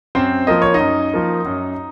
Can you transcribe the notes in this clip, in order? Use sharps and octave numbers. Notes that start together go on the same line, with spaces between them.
F#2 C4 C5
F3 A#3 D#5
C#5
D#4 D#5
F#2
F3 A#3
F#2